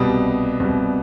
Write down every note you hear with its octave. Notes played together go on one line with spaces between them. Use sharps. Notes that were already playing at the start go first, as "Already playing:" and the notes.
Already playing: C2 B2 G3 D#6
C2 B2 G3